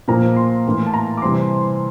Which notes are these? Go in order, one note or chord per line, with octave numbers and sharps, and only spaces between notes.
A#2 F3 A#3 A#5
C6
A2 E3 A#3
A5
A#5
D6
C3 E3 G3 C4 C6